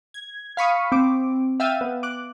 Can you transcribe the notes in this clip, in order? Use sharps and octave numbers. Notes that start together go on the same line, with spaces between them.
G#6
F5 B5 C#6 D#6
C4 D6
E5 F5 G5 E6 A6 D#7
B3
D6 F#6